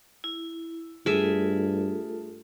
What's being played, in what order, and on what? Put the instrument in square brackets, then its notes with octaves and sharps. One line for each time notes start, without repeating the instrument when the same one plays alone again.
[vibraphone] E4
[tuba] G2 [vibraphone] A3 F4 A4 [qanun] G#4 E5